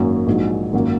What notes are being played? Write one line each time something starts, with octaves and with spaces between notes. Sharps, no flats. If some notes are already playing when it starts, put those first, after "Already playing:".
Already playing: G#1 F#2 F#3 A#3 G#5
A#1 G#2 F#3
G#1 F#2 F#3 A#3